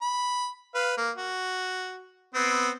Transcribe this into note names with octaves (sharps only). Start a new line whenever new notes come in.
B5
B4 F5
A#3
F#4
B3 C4